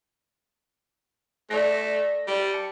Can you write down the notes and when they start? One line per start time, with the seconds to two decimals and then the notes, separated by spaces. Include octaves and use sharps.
1.50 A3 D5 A#6
2.27 G3
2.54 A5 C#7